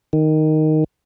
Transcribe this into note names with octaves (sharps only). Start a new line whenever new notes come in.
D#3